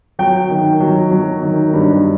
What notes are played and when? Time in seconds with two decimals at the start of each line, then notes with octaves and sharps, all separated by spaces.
0.19 F#3 G5
0.50 D#3
0.81 F#3
1.11 F#3
1.43 D#3
1.73 G2